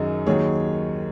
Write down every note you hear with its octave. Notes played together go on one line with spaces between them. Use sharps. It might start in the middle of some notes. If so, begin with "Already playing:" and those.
Already playing: F#2 D#3 F#3 D#4 G#4
D#2 D#3 F#3 G#4 C#5